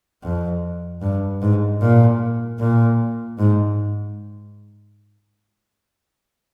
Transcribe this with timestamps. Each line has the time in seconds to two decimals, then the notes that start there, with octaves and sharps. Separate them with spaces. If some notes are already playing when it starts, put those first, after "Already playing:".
0.23 F2
1.02 G2
1.42 G#2
1.81 A#2
2.59 A#2
3.39 G#2